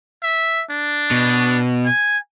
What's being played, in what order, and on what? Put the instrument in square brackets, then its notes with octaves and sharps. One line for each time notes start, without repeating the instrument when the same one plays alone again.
[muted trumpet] E5
D4
[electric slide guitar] B2
[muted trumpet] G#5